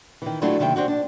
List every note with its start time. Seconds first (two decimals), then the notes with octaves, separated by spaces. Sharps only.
0.22 D#3 E3
0.42 F#3 A3 D4 E4 F4
0.59 D#2 C3 D#3 E5 G5
0.76 C4 D4 F#4
0.88 D4